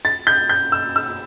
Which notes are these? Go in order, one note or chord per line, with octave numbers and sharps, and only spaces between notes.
A6
G6
G6
E6
E6